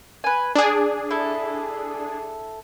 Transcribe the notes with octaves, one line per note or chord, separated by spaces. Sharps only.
B4 G#5
D4 G#4 D5
E4 A4